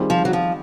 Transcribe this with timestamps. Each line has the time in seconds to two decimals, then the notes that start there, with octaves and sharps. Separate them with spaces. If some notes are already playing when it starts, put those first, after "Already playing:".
Already playing: D#3 G3 C4 F4 G#4
0.10 F3
0.25 F#3
0.33 F3